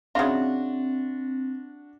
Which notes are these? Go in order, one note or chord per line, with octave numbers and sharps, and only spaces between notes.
C#3 C4 D4 F4 F#4 E5